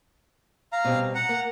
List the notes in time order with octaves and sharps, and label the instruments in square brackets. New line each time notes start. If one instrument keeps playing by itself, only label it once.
[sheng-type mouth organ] F5 A#5
[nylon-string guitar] B2 G3 C4
[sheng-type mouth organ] F#5 A#5
[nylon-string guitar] A#3